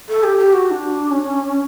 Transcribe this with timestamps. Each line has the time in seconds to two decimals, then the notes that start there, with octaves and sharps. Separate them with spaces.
0.09 A4
0.24 G4
0.38 G4
0.53 F#4
0.67 F#4
0.71 D4
1.11 C#4